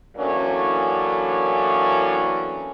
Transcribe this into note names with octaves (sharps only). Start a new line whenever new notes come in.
A2 E3 F#3 A#3 C#4 D4